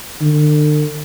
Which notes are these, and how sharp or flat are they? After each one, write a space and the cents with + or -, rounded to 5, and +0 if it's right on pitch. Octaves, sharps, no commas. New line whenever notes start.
D3 +40